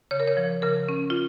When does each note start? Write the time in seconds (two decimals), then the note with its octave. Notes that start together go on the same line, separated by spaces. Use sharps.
0.11 C#3 C#5
0.20 A#4
0.28 C#5
0.37 F3
0.62 C#3 A#4
0.89 C#4
1.10 F4